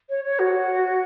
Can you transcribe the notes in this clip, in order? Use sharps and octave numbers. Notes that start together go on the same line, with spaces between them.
C#5
C#5
F#4